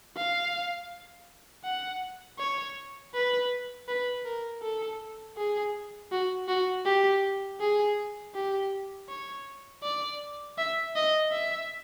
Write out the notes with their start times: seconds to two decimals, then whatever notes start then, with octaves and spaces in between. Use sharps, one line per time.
0.16 F5
1.64 F#5
2.39 C#5
3.14 B4
3.88 B4
4.25 A#4
4.62 A4
5.37 G#4
6.12 F#4
6.48 F#4
6.85 G4
7.60 G#4
8.34 G4
9.09 C#5
9.83 D5
10.58 E5
10.96 D#5
11.32 E5